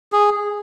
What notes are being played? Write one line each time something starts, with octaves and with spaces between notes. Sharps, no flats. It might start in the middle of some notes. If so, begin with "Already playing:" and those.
G#4